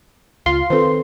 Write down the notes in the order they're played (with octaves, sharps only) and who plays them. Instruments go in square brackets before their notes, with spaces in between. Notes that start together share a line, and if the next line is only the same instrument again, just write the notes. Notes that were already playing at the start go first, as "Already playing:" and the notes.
[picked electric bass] C#2 [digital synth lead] F4 [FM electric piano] C6
[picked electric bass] D#3 C4 [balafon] A4 B4 C5